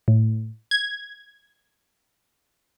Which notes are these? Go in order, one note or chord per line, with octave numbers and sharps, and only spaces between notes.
A2
G#6